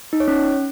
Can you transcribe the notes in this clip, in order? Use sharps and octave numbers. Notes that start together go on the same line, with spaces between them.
D#4
C#5
C#4